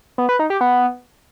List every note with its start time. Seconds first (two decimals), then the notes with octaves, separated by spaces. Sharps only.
0.18 B3
0.29 B4
0.39 D#4
0.50 G4
0.61 B3